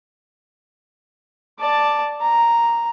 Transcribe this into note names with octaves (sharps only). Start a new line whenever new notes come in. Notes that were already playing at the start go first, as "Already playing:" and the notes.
D5 A5
A#5